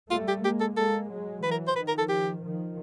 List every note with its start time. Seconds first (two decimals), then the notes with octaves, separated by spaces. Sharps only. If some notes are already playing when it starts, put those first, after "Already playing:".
0.11 G3 A3 F4
0.28 G4
0.44 G#3 A#3 G4
0.60 A4
0.77 G#3 A#3 A4
1.10 F#3 G#3
1.43 E3 F#3 B4
1.51 A#4
1.68 C5
1.76 D#3 F3 B4
1.88 A#4
1.98 A4
2.09 G4
2.43 D#3 F3